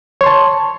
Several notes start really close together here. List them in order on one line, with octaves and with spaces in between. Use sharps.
C#5 C6 A5